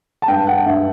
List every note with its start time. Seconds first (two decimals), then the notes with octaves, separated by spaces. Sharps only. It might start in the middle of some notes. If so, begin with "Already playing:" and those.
0.22 A5
0.28 G2 G5
0.47 F#5
0.66 G2 E5